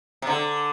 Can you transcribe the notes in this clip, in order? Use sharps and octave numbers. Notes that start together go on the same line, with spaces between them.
C3
D3